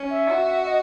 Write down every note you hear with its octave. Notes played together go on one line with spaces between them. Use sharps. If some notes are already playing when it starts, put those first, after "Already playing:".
Already playing: C#4
E5
F#4
D#5